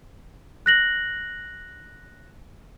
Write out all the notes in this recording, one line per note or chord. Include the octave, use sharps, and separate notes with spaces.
F#6 A#6 F#7